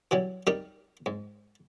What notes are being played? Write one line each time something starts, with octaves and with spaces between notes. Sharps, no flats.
E3 F#3 G3
G3 D#4 G4 A#4 G5
G#2